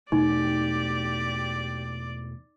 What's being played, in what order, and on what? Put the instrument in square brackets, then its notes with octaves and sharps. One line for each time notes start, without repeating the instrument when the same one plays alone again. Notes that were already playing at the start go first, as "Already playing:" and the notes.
[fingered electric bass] E2 B2 A3 [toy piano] D#4 [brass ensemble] G4 [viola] D5